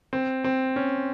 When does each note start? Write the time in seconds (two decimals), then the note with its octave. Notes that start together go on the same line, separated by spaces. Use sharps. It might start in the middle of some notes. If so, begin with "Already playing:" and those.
0.13 C4
0.44 C4
0.76 C#4